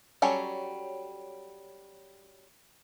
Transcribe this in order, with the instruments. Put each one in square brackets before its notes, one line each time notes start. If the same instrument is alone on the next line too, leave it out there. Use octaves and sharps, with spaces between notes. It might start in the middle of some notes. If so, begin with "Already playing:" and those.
[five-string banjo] F#3 G3 C#4 A4 C#5